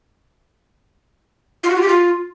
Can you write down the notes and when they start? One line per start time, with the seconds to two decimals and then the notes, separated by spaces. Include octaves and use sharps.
1.63 F4
1.70 F#4
1.76 F4
1.82 G4
1.88 F4